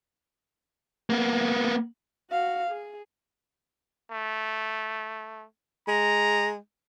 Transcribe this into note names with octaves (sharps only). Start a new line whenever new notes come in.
A#3 B3
F#4 F5
G#4
A3
G#3 A#5